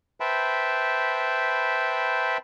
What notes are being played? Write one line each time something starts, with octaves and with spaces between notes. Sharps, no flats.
B4 C5 E5 G5 A5 B5